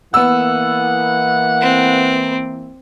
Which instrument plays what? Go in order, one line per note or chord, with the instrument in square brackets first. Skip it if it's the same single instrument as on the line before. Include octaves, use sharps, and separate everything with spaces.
[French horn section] E3 A#3 [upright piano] B3 E6 [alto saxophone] F#5
[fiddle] C4